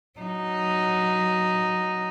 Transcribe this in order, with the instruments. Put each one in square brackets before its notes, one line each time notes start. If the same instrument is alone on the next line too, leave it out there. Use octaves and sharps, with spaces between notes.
[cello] F#3 D#4